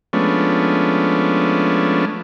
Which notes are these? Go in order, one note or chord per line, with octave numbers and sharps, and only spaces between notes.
F3 G#3 A3 B3 C#4 D4